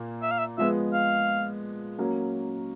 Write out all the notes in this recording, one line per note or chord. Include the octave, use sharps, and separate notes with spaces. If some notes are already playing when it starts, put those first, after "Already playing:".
Already playing: A#2 A#3
E5
F5
E5
F3 G#3 B3 E5
F5
F#3 A#3 C#4